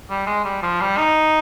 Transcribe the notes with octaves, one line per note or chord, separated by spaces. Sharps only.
G3
G#3
G3
F3
G3
D#4